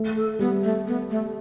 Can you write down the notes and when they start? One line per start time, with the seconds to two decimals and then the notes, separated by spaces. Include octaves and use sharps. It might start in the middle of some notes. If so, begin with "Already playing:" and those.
Already playing: A3
0.16 A4
0.39 G3 B3
0.63 A3
0.87 B3
1.11 A3